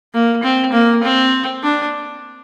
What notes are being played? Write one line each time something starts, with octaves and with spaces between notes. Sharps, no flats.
A#3
C4
A#3
C4
D4